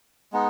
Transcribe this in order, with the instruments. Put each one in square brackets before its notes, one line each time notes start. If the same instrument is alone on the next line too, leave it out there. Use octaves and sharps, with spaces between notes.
[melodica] G#3 B3 D#4